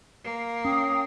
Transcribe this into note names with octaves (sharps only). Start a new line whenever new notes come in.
A#3
C#4 G5 D#6